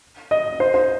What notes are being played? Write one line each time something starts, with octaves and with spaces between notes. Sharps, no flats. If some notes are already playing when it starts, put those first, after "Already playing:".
D#5
C5
C5